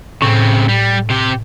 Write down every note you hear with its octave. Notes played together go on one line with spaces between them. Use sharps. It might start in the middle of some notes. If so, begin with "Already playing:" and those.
A2 C#3 C4
G3
C3 G4